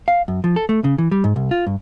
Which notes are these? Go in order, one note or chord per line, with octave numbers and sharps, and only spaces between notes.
F5
F#2
F3
A4
A3
C#3
E3
G3
G#2
C2
F4
G2